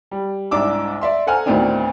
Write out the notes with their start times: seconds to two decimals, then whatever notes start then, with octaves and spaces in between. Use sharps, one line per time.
0.11 G3
0.51 C2 G#2 D4 D6 E6
1.01 D5 E5 C6
1.27 A4 C5 F#5 G#5 A#5 F6
1.46 D2 A2 D#3 B3 C4 D4